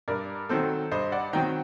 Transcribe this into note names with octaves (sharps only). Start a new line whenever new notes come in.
G2 A#4 D5
D#3 F#3 C4 A4 C5
G2 C5 D#5
D5 F#5
D#3 F#3 C4 G5 A#5